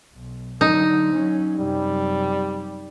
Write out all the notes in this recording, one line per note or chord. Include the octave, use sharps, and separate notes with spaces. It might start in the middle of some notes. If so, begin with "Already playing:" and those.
B1
D3 F#3 D#4
F#3 C#4
F#2 C3 G3